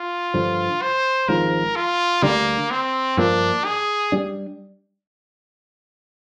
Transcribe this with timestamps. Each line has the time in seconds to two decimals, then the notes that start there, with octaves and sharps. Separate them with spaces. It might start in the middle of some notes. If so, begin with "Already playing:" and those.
Already playing: F4
0.34 G2 D3 F3
0.82 C5
1.28 G#1 G#2 F3 A#4
1.76 F4
2.22 D2 D3 G3 A#3 D4
2.71 C4
3.17 G2 F3 A#3 D4
3.65 G#4
4.12 G3 D4